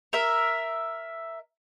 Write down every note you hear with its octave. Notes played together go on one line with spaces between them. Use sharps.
A#4 E5